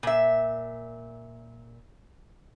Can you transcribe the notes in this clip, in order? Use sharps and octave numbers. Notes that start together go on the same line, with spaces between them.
A#2 E5